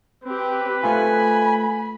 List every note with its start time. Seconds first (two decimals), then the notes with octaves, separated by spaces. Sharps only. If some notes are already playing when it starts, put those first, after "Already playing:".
0.24 C4 G4 B4
0.83 A3 C4 F4 G#5 B5